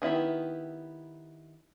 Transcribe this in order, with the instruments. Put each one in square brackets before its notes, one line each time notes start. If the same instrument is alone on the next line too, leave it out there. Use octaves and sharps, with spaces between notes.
[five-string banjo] D#3 B3 E4 G4